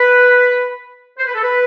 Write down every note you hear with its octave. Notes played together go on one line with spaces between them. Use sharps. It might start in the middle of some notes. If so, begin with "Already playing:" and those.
Already playing: B4
C5
B4
A4
B4